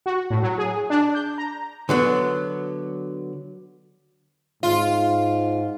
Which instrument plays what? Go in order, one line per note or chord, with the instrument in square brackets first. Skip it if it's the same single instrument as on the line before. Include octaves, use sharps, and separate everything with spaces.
[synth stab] F#4
A2
F#3
G#4
D4
G6
A#5
[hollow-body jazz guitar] D3 F#3 B3
[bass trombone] G#2 [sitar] F4